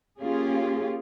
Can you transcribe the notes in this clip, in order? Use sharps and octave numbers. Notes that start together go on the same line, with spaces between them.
A#3 C#4 F4 G4 G#4